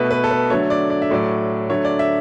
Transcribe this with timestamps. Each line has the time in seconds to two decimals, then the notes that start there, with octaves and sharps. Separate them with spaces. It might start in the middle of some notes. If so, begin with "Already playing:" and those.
Already playing: B2 A3 B4
0.11 B4
0.24 A4
0.31 B4
0.50 D3 F#3 A3 C#5
0.70 D5
0.90 D5
1.02 E5
1.10 A2 F#3 A3 D5
1.70 D3 F#3 A3 C#5
1.85 D5
1.99 E5